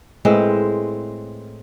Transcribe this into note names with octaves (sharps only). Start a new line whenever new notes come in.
A2 G#3 C4 B4